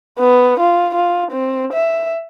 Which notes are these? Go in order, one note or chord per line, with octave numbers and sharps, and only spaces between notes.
B3
F4
F4
C4
E5